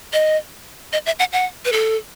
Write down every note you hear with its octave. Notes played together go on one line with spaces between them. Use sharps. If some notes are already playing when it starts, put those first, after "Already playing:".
D#5
D#5
E5
F#5
F#5
B4
A4